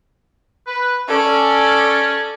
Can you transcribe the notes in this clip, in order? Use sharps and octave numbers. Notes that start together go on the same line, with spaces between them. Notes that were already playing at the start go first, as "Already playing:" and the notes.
B4
C#4 A4 D5